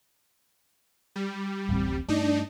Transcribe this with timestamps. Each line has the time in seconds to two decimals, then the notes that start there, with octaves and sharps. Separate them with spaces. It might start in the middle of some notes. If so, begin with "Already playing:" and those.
1.16 G3
1.69 D1 A1 C4
2.08 G2 A3 D4 D#4